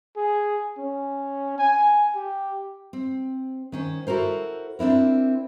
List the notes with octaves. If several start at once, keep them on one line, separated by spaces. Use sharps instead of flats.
G#4
C#4
G#5
G4
C4
D#3 C#4 C5
E4 F#4 A4 A#4 C5
C4 D4 E4 A#4